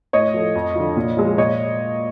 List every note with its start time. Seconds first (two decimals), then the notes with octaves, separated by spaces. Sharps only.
0.13 A2 C#5 D#5
0.34 F3 A3
0.55 F2
0.75 D3 F3
0.97 A#2
1.17 F3 G#3
1.38 A#2 C#5 D#5